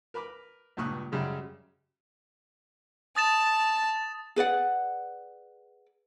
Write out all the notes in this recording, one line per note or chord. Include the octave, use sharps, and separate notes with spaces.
A#4 B4 B5 D6
C#2 G2 A#2 C#6 D#6 F#6
F#2 C#3 G3 G#3
A5 D#6 A6 E7
G#4 B4 D5 F#5